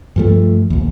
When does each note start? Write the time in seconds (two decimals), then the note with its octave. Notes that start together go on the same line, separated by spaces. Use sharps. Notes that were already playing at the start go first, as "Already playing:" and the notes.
0.16 G2 F3 A3
0.70 A#1 D#2